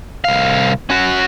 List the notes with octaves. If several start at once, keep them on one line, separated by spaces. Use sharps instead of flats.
C2 F5
C#4 F#4